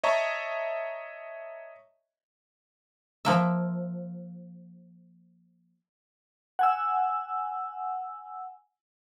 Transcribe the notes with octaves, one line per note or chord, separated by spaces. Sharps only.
C#5 D#5 E5 A5 A#5 C#6
F3 A#3 E5
F#5 G#5 E6